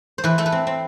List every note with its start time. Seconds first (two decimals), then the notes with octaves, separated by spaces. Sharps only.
0.18 C5
0.24 E3 B4
0.38 A3 A4
0.46 B4
0.52 C4
0.67 C4